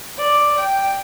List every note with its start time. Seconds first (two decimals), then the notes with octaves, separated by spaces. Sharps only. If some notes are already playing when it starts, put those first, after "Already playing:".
0.17 D5
0.58 G5